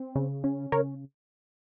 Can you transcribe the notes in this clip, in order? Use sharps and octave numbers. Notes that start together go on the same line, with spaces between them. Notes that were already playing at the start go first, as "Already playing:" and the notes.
Already playing: C4
C#3
C#4
C#3 A#4 C#5